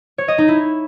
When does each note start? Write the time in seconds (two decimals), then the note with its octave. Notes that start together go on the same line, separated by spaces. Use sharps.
0.18 C#5
0.28 D#5
0.38 D#4
0.48 E4